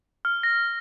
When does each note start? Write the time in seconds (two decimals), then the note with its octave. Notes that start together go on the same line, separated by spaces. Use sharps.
0.25 F6
0.43 A#6